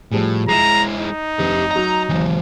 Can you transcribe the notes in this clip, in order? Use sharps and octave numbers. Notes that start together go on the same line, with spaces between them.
A2 F3 G3 G#4
G#3 E4 A#5 C7 D#7 E7
D#4
F1 G4 B4
F#3 D#5 A#5
G#1 D#2 E3 F#3